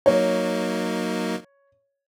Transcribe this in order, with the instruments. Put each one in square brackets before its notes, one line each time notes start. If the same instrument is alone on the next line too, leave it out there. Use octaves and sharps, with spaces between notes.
[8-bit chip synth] F#3 A#3 D#4 [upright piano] C#5